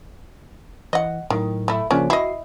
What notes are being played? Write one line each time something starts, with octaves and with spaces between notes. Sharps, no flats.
E3 D#5 F#5
A2 D#3 F#3
A3 E4
C#3 F3 A#3 C#4 D4
E4 F#4 D#5 C7